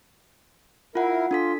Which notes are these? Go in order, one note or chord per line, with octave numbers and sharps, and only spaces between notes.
E4 F4 A#4 F#5
D4 F4 A4 B6